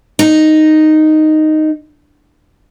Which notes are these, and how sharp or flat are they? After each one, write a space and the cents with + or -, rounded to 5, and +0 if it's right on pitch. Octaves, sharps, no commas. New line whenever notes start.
D#4 -5